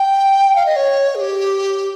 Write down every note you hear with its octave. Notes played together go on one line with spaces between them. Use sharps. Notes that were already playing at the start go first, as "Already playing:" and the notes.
Already playing: G5
F5
D#5
C#5
G#4
G4